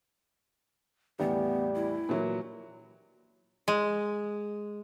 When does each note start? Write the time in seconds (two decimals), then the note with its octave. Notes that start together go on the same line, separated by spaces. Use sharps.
1.20 E2 A2 G3 B3
1.75 E4
2.09 A#2 E3 F#3
3.68 G#3